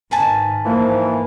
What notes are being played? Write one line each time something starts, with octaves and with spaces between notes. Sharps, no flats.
G#2 D#3 B4 G#5 A5
G#2 E3 F3 A#3